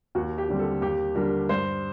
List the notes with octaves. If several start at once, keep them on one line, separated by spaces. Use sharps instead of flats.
D#2 F#4
G4
D3 G3 C4
A4
D#2 G4
D3 G3 D4 A#4
G2 C5